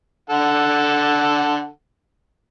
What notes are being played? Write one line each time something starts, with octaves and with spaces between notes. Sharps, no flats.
D3 A4 F#5